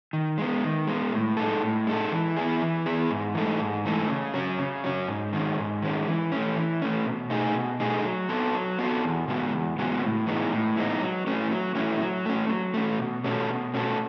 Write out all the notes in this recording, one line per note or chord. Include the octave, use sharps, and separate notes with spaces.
D#3
G#3 B3
D#3
G#3 B3
A2
G#3 D#4 A4
A2
G#3 D#4 A4
E3
B3 E4 G#4
E3
B3 E4 G#4
G#2
E3 A3 D#4 A4
G#2
E3 A3 D#4 A4
C#3
F#3 C#4
C#3
F#3 C#4
G#2
D#3 G#3 C#4
G#2
D#3 G#3 C#4
E3
A3 C#4
E3
A3 C#4
B2
A3 D#4 G#4
B2
A3 D#4 G#4
F#3
B3 F#4 A4
F#3
B3 F#4 A4
E2
C#3 G#3 B3 F#4
E2
C#3 G#3 B3 F#4
A2
E3 G#3 B3 D#4
A2
E3 G#3 B3 D#4
F#3
A3 C#4 E4
F#3
A3 C#4 E4
F#3
A3 C#4
F#3
A3 C#4
B2
A3 C#4 F#4 A4
B2
A3 C#4 F#4 A4